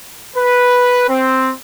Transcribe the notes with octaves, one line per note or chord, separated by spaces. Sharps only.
B4
C4